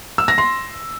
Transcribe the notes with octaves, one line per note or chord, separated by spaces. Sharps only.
E6
A#6
C6